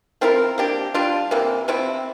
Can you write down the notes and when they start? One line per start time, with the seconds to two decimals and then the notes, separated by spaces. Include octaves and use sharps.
0.21 F3 C4 E4 A#4
0.58 A#3 D4 G4
0.94 G3 D4 F4
1.31 C3 E3 A#3
1.68 C3 F3 C4 E4